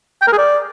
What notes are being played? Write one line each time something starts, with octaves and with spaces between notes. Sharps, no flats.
G5
A#4
G#4
D5